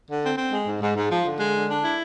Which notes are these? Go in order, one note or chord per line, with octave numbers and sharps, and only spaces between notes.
D3
C4
C4
G#3
G#2
G#2
G#2
F3
D3
G#3
D3
D4
E4